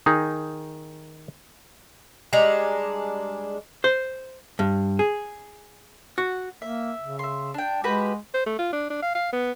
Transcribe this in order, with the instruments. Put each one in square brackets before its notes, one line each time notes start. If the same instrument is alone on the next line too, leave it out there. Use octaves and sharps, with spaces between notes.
[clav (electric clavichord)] D#3 D#4 G#4
[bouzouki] G3 G#3 D4 A#5
[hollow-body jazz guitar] C5
G2
G#4
F#4
[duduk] A#3 [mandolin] E5
[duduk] C#3
[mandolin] E5 C6
D4 G5
[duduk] G#3 [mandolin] F#4 G4 B4
[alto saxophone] C5
A3
F4
D4
D4
F5
F5
B3